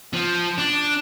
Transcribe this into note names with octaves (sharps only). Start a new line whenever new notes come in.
F3
D4